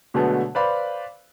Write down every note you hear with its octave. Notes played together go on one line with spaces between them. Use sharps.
B2 D3 F#3 G#3 A3 B3
B4 C5 D5 F5 B5